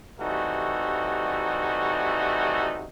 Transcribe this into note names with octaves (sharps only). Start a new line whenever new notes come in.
C3 E3 G3 A3 D#4 F#4